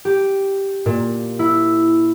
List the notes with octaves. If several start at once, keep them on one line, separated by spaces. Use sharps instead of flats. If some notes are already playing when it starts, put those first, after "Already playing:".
G4
A#2
E4